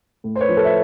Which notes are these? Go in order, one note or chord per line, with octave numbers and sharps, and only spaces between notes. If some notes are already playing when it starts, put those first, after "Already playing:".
A2
C5
B4 C#5
F3
A4 B4
E5